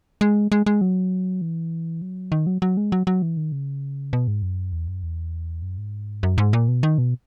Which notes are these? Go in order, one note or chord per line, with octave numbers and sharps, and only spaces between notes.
G#3
G#3
G#3
F#3
E3
F#3
D#3
F#3
F#3
G#3
F#3
F#3
E3
D#3
C#3
B2
G#2
F#2
E2
F#2
E2
F#2
G#2
F#2
G#2
A#2
B2
D#3
B2